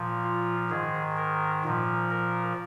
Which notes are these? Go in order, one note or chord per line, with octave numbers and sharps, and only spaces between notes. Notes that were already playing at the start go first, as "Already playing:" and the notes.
Already playing: A#2 F3
F4
G#2 D#3 G#4
A#4
A#2 F3
A#4